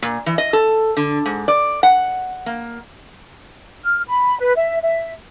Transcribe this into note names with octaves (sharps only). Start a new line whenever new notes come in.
A#2
E3
D#5
A4
D3
G#2
D5
F#5
A#3
F6
B5
B4
E5
E5